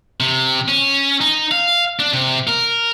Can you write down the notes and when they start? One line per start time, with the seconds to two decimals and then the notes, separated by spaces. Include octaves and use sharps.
0.20 C3
0.68 C#4
1.21 D#4
1.52 F5
1.99 D4
2.13 C3
2.47 A#4